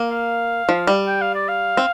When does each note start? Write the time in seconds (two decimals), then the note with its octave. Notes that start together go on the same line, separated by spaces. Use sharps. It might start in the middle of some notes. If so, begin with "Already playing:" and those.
Already playing: A#3
0.11 F5
0.69 F3
0.87 G3
1.07 G5
1.22 F5
1.35 D5
1.48 F5
1.77 C4